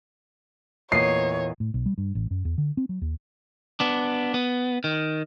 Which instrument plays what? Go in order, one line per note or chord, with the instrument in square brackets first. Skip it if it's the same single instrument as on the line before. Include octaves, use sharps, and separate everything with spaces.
[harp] E2 A#2 D#5 [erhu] C#5 [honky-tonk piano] C7
[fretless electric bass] A2
B1
G3
G2
A1
F#2
E2
D3
C4
F#3
D#2
[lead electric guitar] B3 D4
B3
D#3